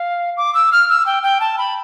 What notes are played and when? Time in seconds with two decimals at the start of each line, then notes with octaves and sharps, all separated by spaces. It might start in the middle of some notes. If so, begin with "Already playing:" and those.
Already playing: F5
0.37 D6
0.54 E6
0.72 F6
0.89 E6
1.06 G5
1.23 G5
1.41 A5
1.58 B5